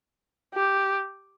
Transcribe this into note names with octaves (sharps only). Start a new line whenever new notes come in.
G4